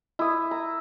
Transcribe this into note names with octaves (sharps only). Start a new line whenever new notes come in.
E4 D#6
A#5